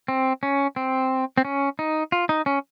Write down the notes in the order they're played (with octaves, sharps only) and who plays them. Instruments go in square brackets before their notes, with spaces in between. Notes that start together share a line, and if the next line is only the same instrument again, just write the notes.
[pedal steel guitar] C4
C#4
C4
C4
C#4
D#4
F4
D#4
C#4